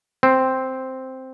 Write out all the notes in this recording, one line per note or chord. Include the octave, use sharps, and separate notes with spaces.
C4